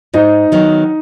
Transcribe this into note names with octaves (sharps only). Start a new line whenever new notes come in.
G#2 D#4 D#5
D#3 F#3 B3